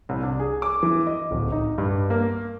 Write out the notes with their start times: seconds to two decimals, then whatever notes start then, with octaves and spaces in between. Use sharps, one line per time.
0.09 C2
0.23 D4
0.40 G#4
0.62 D6
0.83 E3
1.07 D#5
1.31 D1
1.52 D#4
1.78 G2
2.10 A#3